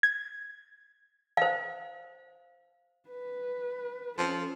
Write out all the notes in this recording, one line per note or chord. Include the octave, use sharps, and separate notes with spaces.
G#6
C5 F5
B4
F3 C#4 A4